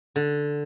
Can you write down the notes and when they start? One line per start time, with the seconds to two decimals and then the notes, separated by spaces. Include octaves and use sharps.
0.16 D3